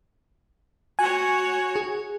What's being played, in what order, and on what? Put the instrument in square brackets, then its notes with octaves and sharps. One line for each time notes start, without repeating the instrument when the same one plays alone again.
[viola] F#4 C#5 [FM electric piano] G#5
[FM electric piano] G#4